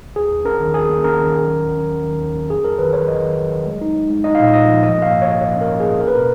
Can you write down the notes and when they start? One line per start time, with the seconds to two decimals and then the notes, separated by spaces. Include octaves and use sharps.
0.16 D#2 G#4
0.31 D#2
0.45 C#4 A#4
0.60 D#3
0.74 D#2 G#4
0.89 A#3
1.04 C#4 A#4
1.19 D#3
1.33 C#4
1.47 F#3
1.62 D#2
1.77 C#4
1.92 D#2
2.06 D#3
2.21 D#2
2.35 C#4
2.49 F2 G#4
2.64 F#3 A#4
2.79 D#3 B4
2.93 D#3 C#5
3.08 F#3 D#5
3.22 D#3
3.37 F#3
3.52 F#3
3.66 G#3
3.81 D#4
3.95 G#3
4.10 G#3
4.24 D#4 D#5
4.35 F5
4.40 A#2 D#5
4.54 A#2 D#5
4.68 F3
4.83 F3 D#5
4.98 A#3 F5
5.12 G#2
5.22 A#3 C#5
5.41 A#3 C#5
5.56 C#4
5.61 A#4
5.71 A#3
5.80 G#4
5.85 A#3
6.00 C#4 A#4
6.07 B4
6.14 B2 A#4